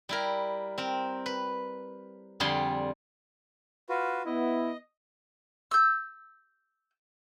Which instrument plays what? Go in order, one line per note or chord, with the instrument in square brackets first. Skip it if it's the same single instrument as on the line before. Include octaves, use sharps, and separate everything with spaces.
[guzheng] G3 E4 A#4
C4 A#4
B4
F2 D3 G3 F4 G#4 C6
[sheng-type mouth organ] F4 F#4 B4
[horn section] B3 E4 [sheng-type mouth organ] D#5
[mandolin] E6 G6